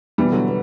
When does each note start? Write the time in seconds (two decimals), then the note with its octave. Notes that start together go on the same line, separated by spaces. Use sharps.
0.18 B2 E3 G3
0.32 D3 F#3
0.47 B3